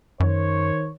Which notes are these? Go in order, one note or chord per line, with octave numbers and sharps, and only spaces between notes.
F#2 D#3 C5 C#5